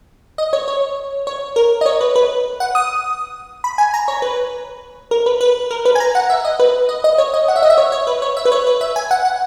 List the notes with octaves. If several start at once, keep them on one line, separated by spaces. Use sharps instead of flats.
D#5
C#5
C#5
C#5
A#4
D#5
C#5
B4
B4
F#5
D#6
B5
G#5
A#5
C#5
B4
A#4
B4
B4
A#4
B4
G#5
A#5
F#5
E5
D#5
B4
D#5
D#5
C#5
D#5
F#5
E5
D#5
E5
C#5
C#5
B4
C#5
E5
B4
C#5
B4
E5
G#5
F#5
F#5